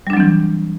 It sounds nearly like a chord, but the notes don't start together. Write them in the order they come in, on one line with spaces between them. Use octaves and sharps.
G3 D4 F#3 C4 E3